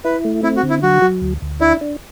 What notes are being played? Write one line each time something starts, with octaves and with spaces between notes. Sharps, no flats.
E4 B4
A3
C4 E4
F#4
D3
E4
F#3 F#4
F#3
D2
D2
D4 E4
D4